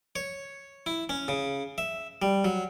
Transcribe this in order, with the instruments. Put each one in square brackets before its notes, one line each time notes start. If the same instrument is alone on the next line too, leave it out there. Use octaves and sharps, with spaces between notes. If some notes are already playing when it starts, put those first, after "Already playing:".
[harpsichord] C#5
E4
C#4
C#3
E5
G3
F#3